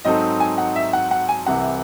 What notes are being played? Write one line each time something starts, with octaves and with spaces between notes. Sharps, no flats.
G#2 F#3 C4 D#4 A4 D#5
G#5
F#5
E5
F#5
F#5
G#5
C2 C3 E3 F#5